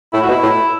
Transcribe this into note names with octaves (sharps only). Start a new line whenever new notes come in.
A2 E4
F#4
B2
E4
A2